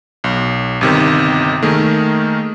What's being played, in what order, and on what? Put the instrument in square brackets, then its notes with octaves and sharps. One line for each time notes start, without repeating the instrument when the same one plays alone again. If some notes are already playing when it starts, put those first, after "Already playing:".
[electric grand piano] B1
G1 C3 D#3
D#3 A3 A#3 G#4 A#4